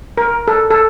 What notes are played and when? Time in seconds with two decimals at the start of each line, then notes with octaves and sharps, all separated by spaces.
0.17 A#4
0.48 A4
0.71 A4